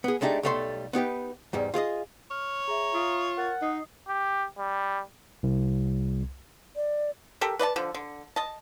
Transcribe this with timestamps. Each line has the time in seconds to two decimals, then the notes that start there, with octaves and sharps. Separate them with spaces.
0.04 B3 G#4
0.21 G#3 A3 D4 D#4 G4
0.43 B1 G3 A3 A4 C#5 C6
0.93 B3 D#4 G4 B4
1.53 E2 G#2 G3
1.74 F4 G#4 D5 D#5
2.31 C#5 F6
2.68 G#4 E5 A#5
2.94 F4 E5 C#6 D#6
3.37 A#4 F#5 F6 A6
3.62 D#4 D#5 D#6 C7
4.07 G4
4.58 G3
5.43 C2
6.76 D5
7.41 G4 A4 A#4
7.59 B4 D5 D#5 A5
7.76 D3 F3
7.94 D3
8.36 D#5 A5